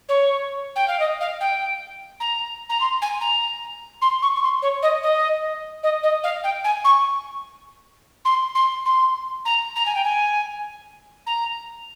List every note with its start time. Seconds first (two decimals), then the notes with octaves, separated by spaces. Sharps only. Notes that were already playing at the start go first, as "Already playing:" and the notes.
0.08 C#5
0.75 G5
0.87 F5
0.99 D#5
1.20 F5
1.40 G5
2.20 A#5
2.69 A#5
2.80 C6
3.01 G#5
3.20 A#5
4.01 C6
4.22 C#6
4.35 C#6
4.42 C6
4.62 C#5
4.82 D#5
5.02 D#5
5.83 D#5
6.03 D#5
6.23 F5
6.43 G5
6.64 G#5
6.84 C#6
8.24 C6
8.55 C6
8.85 C6
9.45 A#5
9.75 A#5
9.85 G#5
9.94 G5
10.04 G#5
11.26 A#5